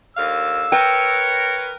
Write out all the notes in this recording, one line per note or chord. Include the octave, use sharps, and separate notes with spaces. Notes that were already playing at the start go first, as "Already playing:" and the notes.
D#2 D3 F5 E6
A#4 B4 C#5 G5